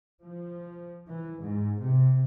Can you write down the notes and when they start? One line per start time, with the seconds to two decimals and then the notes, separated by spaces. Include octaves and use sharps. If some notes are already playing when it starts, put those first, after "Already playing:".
0.21 F3
1.07 E3
1.40 G#2
1.78 C3